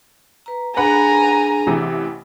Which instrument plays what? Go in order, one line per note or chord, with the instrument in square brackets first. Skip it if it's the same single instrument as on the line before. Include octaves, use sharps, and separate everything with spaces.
[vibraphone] B4 A#5
[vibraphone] D4 G#4 [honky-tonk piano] B4 F#5 B5 [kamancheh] G#5 A#5
[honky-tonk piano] A1 C3 E3